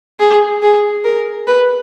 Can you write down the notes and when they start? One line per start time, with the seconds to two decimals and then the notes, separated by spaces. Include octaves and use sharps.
0.20 G#4
0.62 G#4
1.04 A#4
1.48 B4